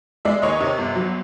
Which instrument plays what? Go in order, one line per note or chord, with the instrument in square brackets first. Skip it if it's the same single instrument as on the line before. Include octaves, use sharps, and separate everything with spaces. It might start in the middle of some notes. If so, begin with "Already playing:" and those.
[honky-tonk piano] G#3 D5 E5
D#2 C#5 D#5
C3
G1
F#3